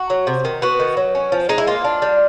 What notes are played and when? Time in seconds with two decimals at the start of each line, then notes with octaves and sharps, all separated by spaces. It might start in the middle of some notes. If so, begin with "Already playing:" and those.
Already playing: F#4
0.10 F#3
0.27 C3
0.45 D#3
0.62 B3 F#4
0.80 D#3
0.97 F#3
1.15 C#4
1.32 F3
1.49 G#3 D#4
1.58 E4
1.67 A#3 F4
1.84 D4
2.02 G3